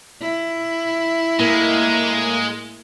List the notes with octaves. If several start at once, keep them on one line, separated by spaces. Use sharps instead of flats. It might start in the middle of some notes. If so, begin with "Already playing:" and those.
E4
A2 G#3 A#3